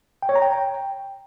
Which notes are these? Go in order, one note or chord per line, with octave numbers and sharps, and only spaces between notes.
G5
C#5
A#5
G5